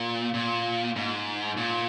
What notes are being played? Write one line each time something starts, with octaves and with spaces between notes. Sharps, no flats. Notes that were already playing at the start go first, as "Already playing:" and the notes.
Already playing: A#2
A#2
G#2
A#2